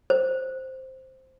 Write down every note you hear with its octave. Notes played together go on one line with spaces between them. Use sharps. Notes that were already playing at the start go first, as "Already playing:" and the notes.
C5